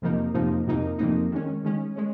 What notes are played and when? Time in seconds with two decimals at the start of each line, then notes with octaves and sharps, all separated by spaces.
0.02 F2 C3 F3 A#3 D#4
0.34 F2 C3 F3 A#3 D#4
0.67 F2 C3 F3 A#3 D#4
0.98 F2 C3 F3 A#3 D#4
1.31 D#3 G#3 C#4
1.64 D#3 G#3 C#4
1.96 G#3 C#4